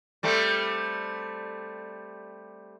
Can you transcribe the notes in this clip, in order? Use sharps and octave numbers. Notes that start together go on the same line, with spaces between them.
G3 A3 C4